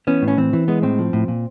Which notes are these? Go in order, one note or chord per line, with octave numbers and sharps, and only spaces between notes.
E3 B3 C#4
A2
C#4
E3 C4
E3
G#3 B3
A2 C4
F3
A2
A#2